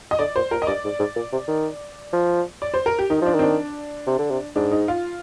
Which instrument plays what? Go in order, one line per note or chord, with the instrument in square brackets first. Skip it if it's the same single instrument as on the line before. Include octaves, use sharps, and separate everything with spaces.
[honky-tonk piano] D#5
[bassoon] D3 [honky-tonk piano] D5
[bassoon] A#2 [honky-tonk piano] C5
[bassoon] A#2 [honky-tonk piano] A#4
[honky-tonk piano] D#5
[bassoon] G2 [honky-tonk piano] D5
[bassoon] G#2
G#2
A#2
C3
D#3
F3
[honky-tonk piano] D5
C5
A#4
G4
[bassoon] D#3 [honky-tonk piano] D#4
[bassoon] F3 [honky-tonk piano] D4
[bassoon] D#3 [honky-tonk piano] C4
[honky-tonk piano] D4
[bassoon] C3
D3
C3
[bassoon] G#2 [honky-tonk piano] D4
[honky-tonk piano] D#4
F4